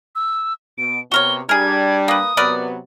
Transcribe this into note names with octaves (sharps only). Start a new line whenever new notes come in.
E6
B2 D7
C3 B3 F#4 A#4 C#5 G7
G3 D4 G#4 A#4 G#6
A#3 B4 D#6
C3 F#3 B3 A#4 B4 D5